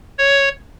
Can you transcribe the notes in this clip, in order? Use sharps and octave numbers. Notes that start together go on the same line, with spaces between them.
C#5